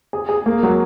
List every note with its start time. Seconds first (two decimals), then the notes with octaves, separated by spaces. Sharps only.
0.13 G#4
0.29 G#4
0.46 A#3
0.63 F#3